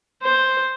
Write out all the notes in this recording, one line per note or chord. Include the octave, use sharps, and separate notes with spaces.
C5